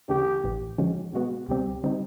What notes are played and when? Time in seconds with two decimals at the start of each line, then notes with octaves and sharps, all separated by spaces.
0.09 D2 C#3 E3 A3 D4 G4
0.44 A1 A2 E3
0.78 D3 F3 G#3 C#4 F#4
1.13 B2 G#3 B3 F#4
1.48 C#2 B2 G3 C4 G4
1.83 D3 G3 C4 D#4